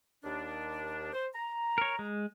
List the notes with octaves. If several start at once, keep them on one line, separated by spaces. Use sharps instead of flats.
D#2 D4
C5
A#5
A#4 C#5
G#3